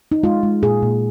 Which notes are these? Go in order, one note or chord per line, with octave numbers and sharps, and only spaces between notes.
D#4
G#3 F4
G#3
A#2 G#4
A#2